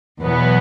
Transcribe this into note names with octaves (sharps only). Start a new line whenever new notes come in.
E2 B2 F#3 B3